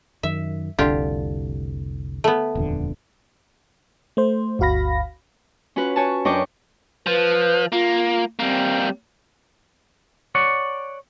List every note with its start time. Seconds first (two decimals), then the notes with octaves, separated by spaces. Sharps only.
0.23 F#2 D#3 E5
0.79 F1 C2 D3 F4 G4
2.24 A3 B3
2.55 D#1 F2 D3
4.17 A3 C5
4.59 G1 D2 F#4 F5 B5 A#6
5.76 C#4 F4 F#4 B4
5.96 C#5 G#5 A5
6.25 F#2 D4 D#5 G5 C#6 D6
7.07 F3 B4
7.72 A#3 F4
8.39 G3 A#3 C4
10.35 C#5 D5 F#5